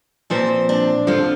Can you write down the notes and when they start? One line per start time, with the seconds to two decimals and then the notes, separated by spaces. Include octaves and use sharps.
0.30 A#2 F3 C4 C5
0.69 D4
1.07 F2 D3 F3 F4